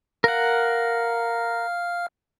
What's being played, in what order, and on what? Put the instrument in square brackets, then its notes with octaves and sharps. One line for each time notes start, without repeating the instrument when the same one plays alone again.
[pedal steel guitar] A#4 F#5 [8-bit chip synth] F5 F6